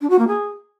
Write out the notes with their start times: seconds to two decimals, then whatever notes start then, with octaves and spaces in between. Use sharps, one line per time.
0.01 D4
0.10 F#4
0.19 A#3
0.28 G#4